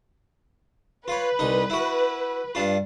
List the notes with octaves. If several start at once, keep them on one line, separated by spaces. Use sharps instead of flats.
F4 B4 C#5
C2 D#4
E4 F#4
G2 D4 F4